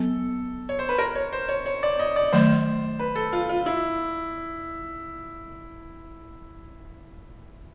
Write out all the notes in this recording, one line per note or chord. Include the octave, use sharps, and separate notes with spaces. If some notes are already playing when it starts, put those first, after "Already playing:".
Already playing: F#3 B3 A4
C#5
C5
B4
A#4
C#5
C5
C#5
C#5
D5
D#5
D5
D#3 F#3 A3 C5
B4
A4
F4
F4
E4